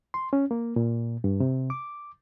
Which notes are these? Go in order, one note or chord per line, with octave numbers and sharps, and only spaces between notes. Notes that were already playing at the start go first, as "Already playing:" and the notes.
C6
C#4
A#3
A#2
G2
C3
D6